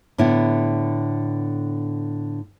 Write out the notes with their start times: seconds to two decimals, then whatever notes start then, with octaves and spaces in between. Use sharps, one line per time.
0.18 A2 D3 B3 E4